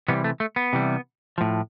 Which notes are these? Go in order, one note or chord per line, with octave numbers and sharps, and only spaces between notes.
C3 E3 G3 B3
A3
A3
B3
C3 E3 G3
A2 F3